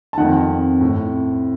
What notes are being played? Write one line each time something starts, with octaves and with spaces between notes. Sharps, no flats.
A5
F2 D#3 F#5
A2